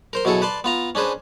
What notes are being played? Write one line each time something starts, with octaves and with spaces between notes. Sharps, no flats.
A#4 C5 C6
B2 F#3 E4 G#4 A4
B4 D5 A5 C6
B3 F4 A#5
C#4 D4 G#4 B4 C5